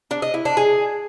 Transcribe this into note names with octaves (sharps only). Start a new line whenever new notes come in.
D4
D#5
E4
D4
G#4